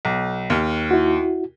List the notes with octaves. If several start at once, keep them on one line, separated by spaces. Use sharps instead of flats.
B1
D#2 F6
E4 F#4